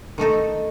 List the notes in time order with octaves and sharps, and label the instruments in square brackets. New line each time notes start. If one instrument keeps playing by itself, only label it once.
[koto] D#3 A3 D#4 A4